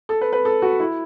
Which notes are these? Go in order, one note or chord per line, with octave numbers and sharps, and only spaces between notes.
A4
B4
B4
A4
F#4
E4